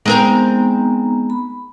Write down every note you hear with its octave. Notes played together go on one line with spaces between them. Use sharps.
G#3 B3 C4 D#4 A#4 A#5
B5